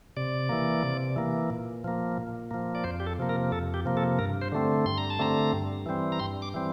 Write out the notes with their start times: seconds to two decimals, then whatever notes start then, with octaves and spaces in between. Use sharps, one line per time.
0.17 C3 D5
0.49 E3 A#3
0.83 C3
1.16 E3 A#3
1.50 A#2
1.84 F3 A#3
2.17 A#2
2.51 F3 A#3
2.75 D5
2.84 F2 C5
3.00 G4
3.06 A4
3.18 C3 F3 A#3
3.29 A#4
3.51 F2 A4
3.74 G4
3.85 C3 F3 A#3
3.97 A4
4.19 G2 A#4
4.41 C5
4.52 D3 A3 C4
4.85 G2 C6
4.98 A#5
5.10 A5
5.19 D3 A3 C4 A#5
5.53 G2
5.86 E3 G3 C4
6.12 A#5
6.19 G2 C6
6.42 D6
6.54 E3 G3 C4